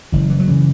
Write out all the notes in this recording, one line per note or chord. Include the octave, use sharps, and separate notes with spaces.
F#1 E3
E3
F#3
C#3 E3